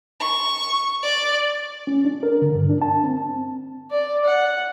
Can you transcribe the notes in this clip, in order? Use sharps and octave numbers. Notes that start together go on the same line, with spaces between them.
C#6
D5
C#4
D4
A#4
D3
G2
D4
A5
C4
D5
F#5